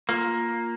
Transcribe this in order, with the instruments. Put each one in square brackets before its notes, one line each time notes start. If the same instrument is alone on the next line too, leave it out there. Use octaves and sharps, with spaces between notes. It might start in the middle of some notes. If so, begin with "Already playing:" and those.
[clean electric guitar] A#3 [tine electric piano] F4